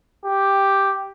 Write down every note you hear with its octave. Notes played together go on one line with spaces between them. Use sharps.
G4